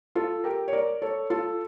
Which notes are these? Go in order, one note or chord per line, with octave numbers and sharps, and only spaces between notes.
F4 A4
G4 A#4
C#5
A#4 D5
A4 C#5
F4 A4